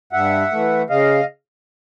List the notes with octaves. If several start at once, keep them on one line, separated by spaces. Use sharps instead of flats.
G2 E5 F#5
E3 A3
C#3 D#5 F5